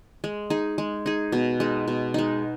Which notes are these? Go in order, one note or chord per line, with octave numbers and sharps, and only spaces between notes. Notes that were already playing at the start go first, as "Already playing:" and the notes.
G#3
D#4 G#4
G#3
D#4 G#4
B2
G#3 D#4
B2
G#3 D#4